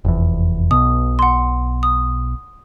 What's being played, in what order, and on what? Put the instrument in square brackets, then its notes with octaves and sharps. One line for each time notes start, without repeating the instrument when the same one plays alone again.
[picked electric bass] F1 E2
[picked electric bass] B1 B2 [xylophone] D#6
[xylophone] F#5 C6
D#6